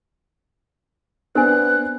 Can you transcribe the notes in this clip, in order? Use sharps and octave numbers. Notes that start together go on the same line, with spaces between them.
B3 C4 D4 A#4 G#5 F#6